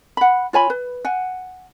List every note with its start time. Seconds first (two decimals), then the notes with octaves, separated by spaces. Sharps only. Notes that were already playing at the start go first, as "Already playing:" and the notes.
0.17 F#5 B5
0.53 F4 C#5 G#5 B5
0.70 B4
1.05 F#5 G#5